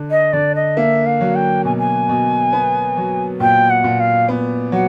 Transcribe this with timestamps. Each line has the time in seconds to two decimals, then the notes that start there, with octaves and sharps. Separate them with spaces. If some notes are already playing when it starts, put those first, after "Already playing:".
Already playing: D3
0.11 D#5
0.33 D3 D5
0.55 D#5
0.77 A#3 E5
1.06 F5
1.21 F#3
1.35 G5
1.65 B2 G#5
1.79 G#5
2.09 B2
2.53 B3
2.97 F#3
3.40 A#2 G5
3.70 F#5
3.84 A#2
4.00 F5
4.28 B3
4.72 F#3 F#5